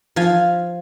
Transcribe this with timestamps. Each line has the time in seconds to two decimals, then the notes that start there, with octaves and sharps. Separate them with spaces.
0.16 F3 F5 G#5